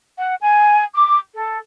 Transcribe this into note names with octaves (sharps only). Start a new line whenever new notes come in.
F#5
G#5
D6
A4